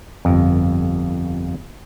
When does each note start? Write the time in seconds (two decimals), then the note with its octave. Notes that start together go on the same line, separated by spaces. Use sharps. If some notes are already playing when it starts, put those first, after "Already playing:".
0.25 G1 F2